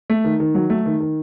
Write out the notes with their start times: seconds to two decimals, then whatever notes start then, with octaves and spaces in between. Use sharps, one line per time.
0.10 A3
0.24 D#3
0.40 D#3
0.55 F#3
0.70 A3
0.86 D#3
1.00 D#3